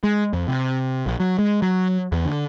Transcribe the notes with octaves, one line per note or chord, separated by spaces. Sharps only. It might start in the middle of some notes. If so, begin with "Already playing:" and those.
G#3
F2
C3
A#1
F#3
G#3
F#3
E2
D3